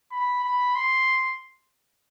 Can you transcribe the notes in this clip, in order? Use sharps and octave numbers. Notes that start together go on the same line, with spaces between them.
B5
B5
C6